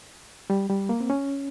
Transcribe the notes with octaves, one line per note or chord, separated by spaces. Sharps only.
G3
G3
A#3
C4
C#4